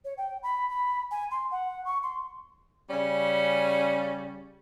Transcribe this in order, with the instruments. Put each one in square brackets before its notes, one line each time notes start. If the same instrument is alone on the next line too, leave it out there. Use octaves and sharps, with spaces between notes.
[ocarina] C#5
G5
B5
B5
G#5
C6
F#5
C#6
C6
[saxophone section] C#3 G3 C#4